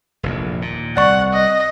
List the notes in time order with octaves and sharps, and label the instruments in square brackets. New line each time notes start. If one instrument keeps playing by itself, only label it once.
[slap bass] F1 A#1 E2
D#2 A#2
[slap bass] C2 [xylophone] D5 C#6 [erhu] F#5
[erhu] D#5